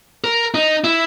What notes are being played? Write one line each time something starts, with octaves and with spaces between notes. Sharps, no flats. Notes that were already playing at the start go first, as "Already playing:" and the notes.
A#4
D#4
E4